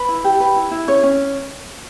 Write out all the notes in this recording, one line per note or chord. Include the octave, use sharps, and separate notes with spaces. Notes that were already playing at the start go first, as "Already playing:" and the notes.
Already playing: B4
E4
G4
B4
E4
E4
C#4 C#5
C#4